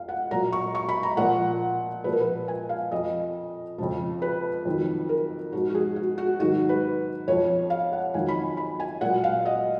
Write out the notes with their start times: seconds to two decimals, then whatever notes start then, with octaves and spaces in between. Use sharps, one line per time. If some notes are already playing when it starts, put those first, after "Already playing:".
Already playing: F2 F5
0.09 F#5
0.31 A#2 F#3 A#5
0.52 C#6
0.75 C#6
0.89 B5
1.03 A#5
1.17 A#2 F3 F#5
2.04 A#2 F3 B4
2.13 A#4
2.21 B4
2.48 G#5
2.69 F5
2.91 F2 F3 D#5
3.78 F2 C#3 F3
4.22 B4
4.65 F2 D#3 F#3
5.09 A#4
5.52 G#2 F3 F#4
5.70 F#4
5.75 G#4
5.96 F#4
6.18 F#4
6.39 G#2 D#3 F#3 F#4
6.69 B4
7.28 F2 F3 C#5
7.70 F5
7.93 F#5
8.14 F2 D#3 F#3 G#5
8.28 B5
8.57 B5
8.80 G#5
9.01 A#2 F#3 F#5
9.24 F5
9.45 D#5